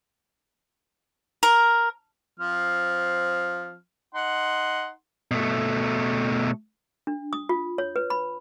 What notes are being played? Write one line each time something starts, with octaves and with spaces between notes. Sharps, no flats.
A#4
F3 C4 F6
D#4 F#5 C6
B2 A3
D4
D#6
F4
C#5
B4
B5